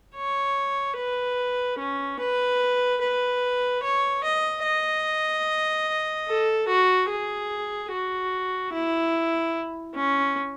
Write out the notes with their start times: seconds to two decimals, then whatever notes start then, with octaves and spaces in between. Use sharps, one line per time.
0.15 C#5
0.97 B4
1.79 C#4
2.20 B4
3.01 B4
3.83 C#5
4.24 D#5
4.64 D#5
6.28 A4
6.68 F#4
7.10 G#4
7.91 F#4
8.73 E4
9.95 C#4